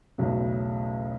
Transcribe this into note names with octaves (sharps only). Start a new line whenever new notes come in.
B1 E2 A2 C#3 F#3